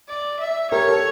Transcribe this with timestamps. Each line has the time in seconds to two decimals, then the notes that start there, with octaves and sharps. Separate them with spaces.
0.08 D5
0.40 E5
0.71 G4 A#4 C#5
0.88 A4